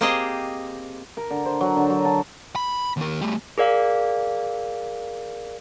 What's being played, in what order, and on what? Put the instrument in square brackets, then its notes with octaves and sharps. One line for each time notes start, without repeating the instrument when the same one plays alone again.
[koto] A#3 C4 G4 G#4 C5 D#5
[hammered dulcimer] A#4
D3
C5
F#3
D3
F#3
A5
[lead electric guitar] B5
D#2 A#4
G3 A3
[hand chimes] G#4 A#4 D5 F5